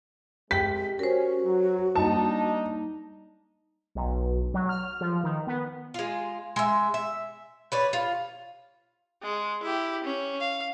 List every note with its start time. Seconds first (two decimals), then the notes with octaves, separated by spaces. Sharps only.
0.51 C2 C3 G#3 G4 G5 B6
0.99 C#4 F#4 A#4 C5
1.44 F#3
1.96 G3 A#3 D4 D#4 A5
3.95 B1
4.54 F#3
4.69 F6
5.01 F3
5.24 D#3
5.47 B3
5.94 G#3 F4
6.56 G#3 E5
6.94 E5
7.72 B4 C#5 D5
7.93 F4
9.22 G#3
9.62 E4 G4
10.04 C#4
10.40 F5